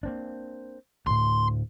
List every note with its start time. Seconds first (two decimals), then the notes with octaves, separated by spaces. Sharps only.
0.03 A#3 C4 D4
1.07 D2 A2 C6